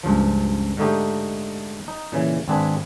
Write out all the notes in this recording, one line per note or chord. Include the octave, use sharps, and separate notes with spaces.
C#2 G2 F3
G#2 D3 A3 D#4 G4
D#4
A#2 C#3 E3
G#1 C4 D4 G#4 B4